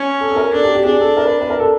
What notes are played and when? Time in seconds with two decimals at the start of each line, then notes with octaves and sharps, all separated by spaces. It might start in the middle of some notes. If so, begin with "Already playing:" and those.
Already playing: C#4
0.20 A4
0.30 A4
0.36 A#4
0.53 D4 A4
0.64 G4
0.75 G4
0.85 D4 G#4
1.01 A4
1.17 A#4
1.25 B4
1.41 B4
1.50 A#4
1.60 A4